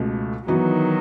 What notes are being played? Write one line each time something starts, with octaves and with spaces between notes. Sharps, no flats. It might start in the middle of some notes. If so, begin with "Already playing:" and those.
Already playing: C#2 B2 A3
D#3 E3 F#3 B3 D#4 F#4